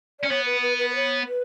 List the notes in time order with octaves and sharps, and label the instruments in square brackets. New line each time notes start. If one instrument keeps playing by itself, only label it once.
[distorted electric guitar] C#4 [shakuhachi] D5
[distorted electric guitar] B3 [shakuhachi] C#5
[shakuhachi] B4
B4
B4
B4
C#5
B4